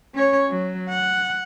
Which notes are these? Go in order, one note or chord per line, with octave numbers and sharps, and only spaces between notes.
C#4 C#5
F#3
F#5